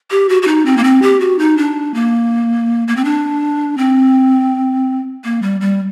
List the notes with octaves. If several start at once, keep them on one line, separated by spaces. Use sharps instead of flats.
G4
F#4
F#4
D#4
C4
A#3
C4
G4
F#4
D#4
D4
A#3
A#3
C4
D4
C4
A#3
G3
G3